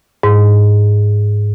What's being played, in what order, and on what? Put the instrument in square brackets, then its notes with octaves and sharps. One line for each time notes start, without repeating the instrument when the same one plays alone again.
[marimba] G#2